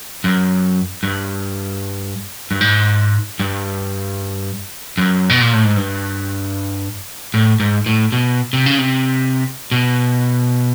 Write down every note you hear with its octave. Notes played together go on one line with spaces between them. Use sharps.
F#2
G2
G2
G#2
G2
F#2
B2
A#2
A2
G#2
G2
A2
G#2
A2
B2
C3
C#3
C3
B2